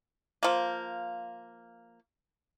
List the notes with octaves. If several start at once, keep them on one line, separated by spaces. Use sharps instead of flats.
F3 A#3